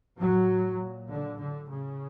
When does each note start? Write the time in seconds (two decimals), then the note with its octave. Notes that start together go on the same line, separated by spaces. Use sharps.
0.20 A2 F#3
0.80 A#2
1.10 D3
1.40 A2 D3
1.70 C#3